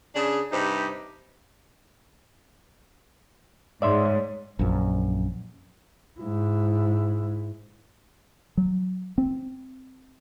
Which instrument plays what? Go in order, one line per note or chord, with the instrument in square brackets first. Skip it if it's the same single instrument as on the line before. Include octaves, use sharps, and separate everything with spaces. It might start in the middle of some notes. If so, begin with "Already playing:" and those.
[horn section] C#3 D4 G#4
G2 C3 D#4 G4
[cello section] G#2 [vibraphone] C#5 [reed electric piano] D5 E5 C6
[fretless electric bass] A#1 F#2
[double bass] G#2 E4
[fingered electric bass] F#3
C4